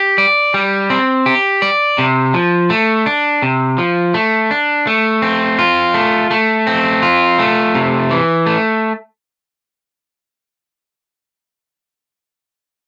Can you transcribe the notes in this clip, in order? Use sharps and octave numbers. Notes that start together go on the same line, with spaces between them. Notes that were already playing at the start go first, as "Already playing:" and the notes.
Already playing: G4
D5
G3
C4
G4
D5
C3
F3
A3
D4
C3
F3
A3
D4
A3
C4
F4
A3
A3
C4
F4
A3
C3
E3
A3